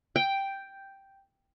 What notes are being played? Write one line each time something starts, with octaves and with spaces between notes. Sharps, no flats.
G5